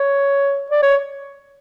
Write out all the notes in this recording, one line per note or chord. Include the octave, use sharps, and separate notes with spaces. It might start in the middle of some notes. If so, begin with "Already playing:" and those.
Already playing: C#5
D5
C#5